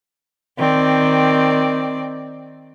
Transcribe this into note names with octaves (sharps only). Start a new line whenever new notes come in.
D#3 C4 D5